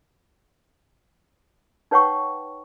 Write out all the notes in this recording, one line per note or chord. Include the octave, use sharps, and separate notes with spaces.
D#4 B4 C#5 F#5 G5 C#6